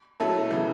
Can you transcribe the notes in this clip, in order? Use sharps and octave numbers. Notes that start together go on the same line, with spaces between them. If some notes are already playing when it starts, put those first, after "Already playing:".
B2 F#3 A3 E4 A4
C#3 E3